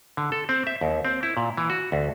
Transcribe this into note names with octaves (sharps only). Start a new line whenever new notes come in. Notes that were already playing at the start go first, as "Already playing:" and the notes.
D3
A4
C4
E5
D#2
C4
E4
A#2
E3
F#4
D2